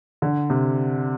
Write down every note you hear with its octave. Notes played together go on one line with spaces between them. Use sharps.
D3
C3